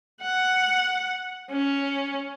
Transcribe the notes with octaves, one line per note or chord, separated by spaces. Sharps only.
F#5
C#4